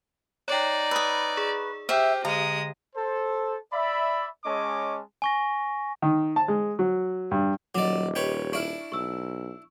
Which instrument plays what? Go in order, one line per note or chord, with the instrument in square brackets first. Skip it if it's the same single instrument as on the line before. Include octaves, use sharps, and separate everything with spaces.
[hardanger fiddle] D#4 D5 [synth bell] C#5 G5
[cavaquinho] B4 B5 [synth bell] D#6 E6
[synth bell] G#4
[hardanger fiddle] G4 [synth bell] C5 G5 [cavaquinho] E5
[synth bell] D3 [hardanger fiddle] G#3 D#6 [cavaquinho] A#5
[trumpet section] A4 C5
D5 E5 B5
G#3 C#4 C#5 D#5 A5 D6
[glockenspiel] G#5 C#6 A#6
[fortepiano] D#3
A5
G#3
F#3
G2
[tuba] D#1 [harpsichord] F#3 D5 [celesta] D#5 D6
[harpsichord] G4 B4 C#5
[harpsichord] D4 E4 [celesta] C#6 F6
[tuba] B1 [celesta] C#6 E6